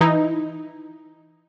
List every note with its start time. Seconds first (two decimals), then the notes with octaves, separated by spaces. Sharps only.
0.01 E3 D#4 E4